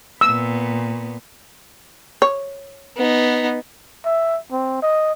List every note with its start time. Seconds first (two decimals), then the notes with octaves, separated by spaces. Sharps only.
0.21 A#2 B3 E6
2.22 C#5
2.97 B3 D#4
4.06 E5
4.52 C4
4.83 D#5